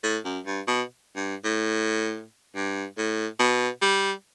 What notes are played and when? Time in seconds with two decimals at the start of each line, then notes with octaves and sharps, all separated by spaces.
0.04 A2
0.25 F#2
0.46 G2
0.68 B2
1.16 G2
1.44 A2
2.56 G2
2.98 A2
3.39 B2
3.82 G3